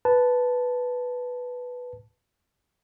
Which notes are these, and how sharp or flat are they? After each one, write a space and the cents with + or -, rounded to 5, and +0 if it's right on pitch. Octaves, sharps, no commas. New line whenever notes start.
B4 +0 A5 -5